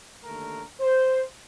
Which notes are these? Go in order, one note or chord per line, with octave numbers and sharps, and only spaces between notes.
D#2 D3 A3 A#4
C5